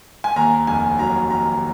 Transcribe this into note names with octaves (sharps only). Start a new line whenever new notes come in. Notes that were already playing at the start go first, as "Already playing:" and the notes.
G#5
D#2 A#5
F1 G#5
F#3 A#5
D#3 A#5